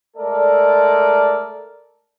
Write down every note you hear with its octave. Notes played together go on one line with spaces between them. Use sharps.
G#3 A3 A4 A#4 D5